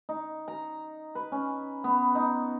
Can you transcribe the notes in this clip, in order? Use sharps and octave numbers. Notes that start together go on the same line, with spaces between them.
D#4
A#5
B4
C#4
B3
D#4